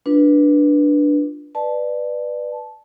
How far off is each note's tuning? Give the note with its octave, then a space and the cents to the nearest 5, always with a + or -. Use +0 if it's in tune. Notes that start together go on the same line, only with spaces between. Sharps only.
D4 +0 F4 -5 B4 -15
B4 +0 D5 +20 A5 -15